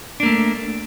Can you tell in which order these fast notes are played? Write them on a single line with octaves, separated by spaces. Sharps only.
D4 A#3 A3